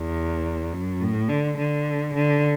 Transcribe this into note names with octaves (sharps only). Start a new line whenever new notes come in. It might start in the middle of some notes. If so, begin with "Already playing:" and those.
Already playing: E2
F#2
A2
D3
D3
D3